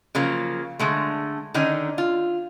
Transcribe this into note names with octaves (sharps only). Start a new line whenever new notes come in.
C#3 F3 F#3 A#3
D3 G#3 A3
D3 D#3 C#4 D#4
F4